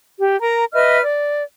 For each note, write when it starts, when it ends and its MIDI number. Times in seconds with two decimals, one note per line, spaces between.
0.20 0.39 67
0.41 0.65 70
0.41 0.65 82
0.73 1.01 71
0.73 1.01 75
0.73 1.01 76
0.73 1.01 89
1.03 1.44 74